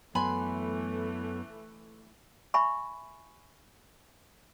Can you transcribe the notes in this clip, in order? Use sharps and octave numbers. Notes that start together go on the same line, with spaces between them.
F#2 E3 A3 B3 G#5 B5 C6
E5 G#5 B5 C#6